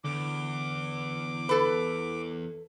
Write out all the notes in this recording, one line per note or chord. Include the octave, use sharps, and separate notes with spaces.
E2 D3 D6
A4 B4